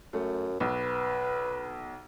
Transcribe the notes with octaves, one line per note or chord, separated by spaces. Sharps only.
F#2 A3
B1 B4